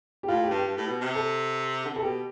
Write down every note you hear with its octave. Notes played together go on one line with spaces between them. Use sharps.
G4
A2 F4
G4
G2
G4
G2
A2
B2
C3
A4
D3
C3 A4
B2 G4